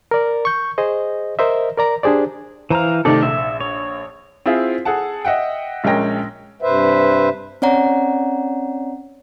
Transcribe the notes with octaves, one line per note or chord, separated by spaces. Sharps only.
A#4 D5
C#6 G6
G#4 C5 D#5
A#4 C5 D#5 E5
A#4 D5 A#5
D4 G4 G#4 C5 D5
E3 C5 F5 A#5
C3 D#3 A3 A4 D5
A#1 E5
C#5
C4 E4 F4 G#4
G#4 A4 F#5 A5
D#5 E5 F#5 G5
A#1 G#3 C#4 A#4 G5 A#6
G2 C3 B4 C5 E5
C4 C#4 C#5 D5 F#5 A#5